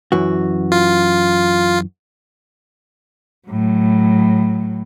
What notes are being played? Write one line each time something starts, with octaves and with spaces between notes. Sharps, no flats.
F#2 E3 F#4
F4
A2 F#3